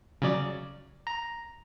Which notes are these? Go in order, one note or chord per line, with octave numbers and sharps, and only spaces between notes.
C#3 F#3 D5
A#5